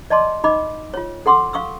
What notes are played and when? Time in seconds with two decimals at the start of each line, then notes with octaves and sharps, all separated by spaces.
0.10 D5 D#5 A5 C6 D6
0.44 D#4 D#5 B5 D6
0.94 F4 C#5
1.26 A4 F#5 C6 D6 E6
1.53 F5 C#6 D#6 E6